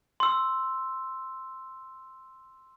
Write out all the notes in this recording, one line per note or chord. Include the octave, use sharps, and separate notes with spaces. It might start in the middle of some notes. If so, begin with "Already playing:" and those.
C6 E6